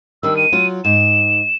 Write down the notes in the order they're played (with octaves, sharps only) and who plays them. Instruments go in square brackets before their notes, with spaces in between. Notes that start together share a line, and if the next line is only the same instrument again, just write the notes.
[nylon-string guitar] D#3 G3 D4 [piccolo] E6
[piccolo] D#7
[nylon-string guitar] F#3 F4
[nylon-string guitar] G#2 [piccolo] E7